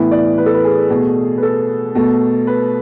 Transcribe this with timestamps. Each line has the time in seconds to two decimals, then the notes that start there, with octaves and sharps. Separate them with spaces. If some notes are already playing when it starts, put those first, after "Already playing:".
Already playing: A2 E3 B3 E4
0.11 D5
0.38 B4
0.46 A4
0.54 B4
0.64 G#4
0.90 B2 A3
1.38 B4
1.43 A4
1.95 B2 A3
2.47 B4